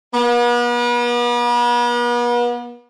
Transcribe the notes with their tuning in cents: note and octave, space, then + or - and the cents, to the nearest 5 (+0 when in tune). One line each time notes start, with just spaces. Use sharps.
B3 -40